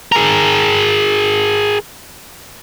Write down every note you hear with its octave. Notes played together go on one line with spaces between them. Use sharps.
G#4 A#4